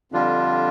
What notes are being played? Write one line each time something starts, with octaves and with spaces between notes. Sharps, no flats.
F2 D3 G3 D4 F4